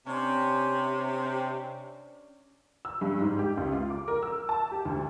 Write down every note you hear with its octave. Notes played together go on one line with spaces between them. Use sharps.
C3 C#4 D4
E6
G2
G#2
G4
C#2
F4
D6
A#4
E6
A5
G4
D2